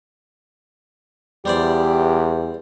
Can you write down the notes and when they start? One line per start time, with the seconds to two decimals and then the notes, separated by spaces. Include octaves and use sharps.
1.45 E2 G3 G4 C5 D5